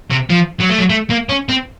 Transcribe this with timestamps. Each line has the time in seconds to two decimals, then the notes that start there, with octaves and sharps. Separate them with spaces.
0.11 C3
0.30 F3
0.60 F#3
0.70 A3
0.78 F#3
0.90 A3
1.10 A#3
1.29 C#4
1.49 C4